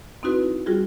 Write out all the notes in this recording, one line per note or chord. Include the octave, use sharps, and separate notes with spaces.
C4 D#4 E4 F#4 B4
G3 F4 F#4 G#4